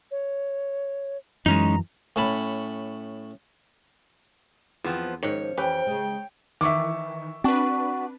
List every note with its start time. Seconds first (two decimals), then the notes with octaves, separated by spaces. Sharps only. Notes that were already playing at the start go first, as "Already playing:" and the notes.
0.11 C#5
1.46 F#2 E3 G#3 C#4 D#4 A#5
2.16 A2 C#4 A5 B5
4.85 E2 F3 B3 C4
5.23 G#2 D#3 F3 C#4 C#5
5.58 F2 E3 F3 C#4 G4 B4 G5
5.87 C#3 G#3
6.61 D#3 E3 E5 C#6 D6
7.44 C4 D4 F#4 B4